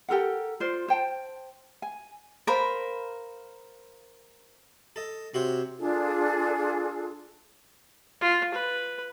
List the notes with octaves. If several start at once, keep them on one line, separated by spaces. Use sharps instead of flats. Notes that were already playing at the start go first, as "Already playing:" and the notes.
G4 A4 A#4 F#5
F4 C5 D5
C5 G5 A5
G#5
A#4 C5 F5 B5
A4 D#5
C3 F#4 C5 C#5
D4 F4 G#4 A4
F4
B4